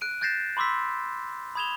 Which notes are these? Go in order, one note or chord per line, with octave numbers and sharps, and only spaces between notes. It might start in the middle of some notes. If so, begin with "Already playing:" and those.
F#6 D7 D#7
F#6 G6 A6 A#6 C7 E7
B5 C6 D6 E6 B6
B5 D#6 G#6 E7 F7 G7